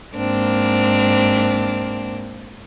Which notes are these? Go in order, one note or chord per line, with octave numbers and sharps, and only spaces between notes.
G#2 A#3 C4 D4